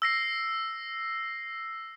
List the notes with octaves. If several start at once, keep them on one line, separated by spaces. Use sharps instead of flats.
E6 A#6 C7